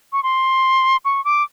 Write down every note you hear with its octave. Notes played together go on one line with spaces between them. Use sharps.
C#6
C6
C#6
D6